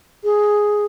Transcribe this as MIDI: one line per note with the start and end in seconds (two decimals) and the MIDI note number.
0.24 0.85 68